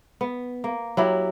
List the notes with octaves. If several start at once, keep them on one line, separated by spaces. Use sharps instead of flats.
B3
A#3
F#3 E4 G4